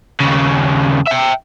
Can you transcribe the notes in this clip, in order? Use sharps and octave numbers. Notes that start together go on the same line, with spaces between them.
D#2 C#3
E5 G5